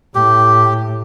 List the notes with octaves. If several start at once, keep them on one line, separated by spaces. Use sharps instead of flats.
A2 G4